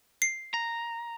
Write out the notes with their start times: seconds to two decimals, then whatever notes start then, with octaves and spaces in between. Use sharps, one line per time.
0.22 C7
0.54 A#5